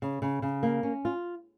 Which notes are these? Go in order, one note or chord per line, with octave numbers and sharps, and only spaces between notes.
C#3
C#3
C#3
A#3
C#4
F4